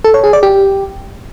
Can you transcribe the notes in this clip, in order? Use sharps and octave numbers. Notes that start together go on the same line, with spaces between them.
A4
C#5
G#4
D5
G4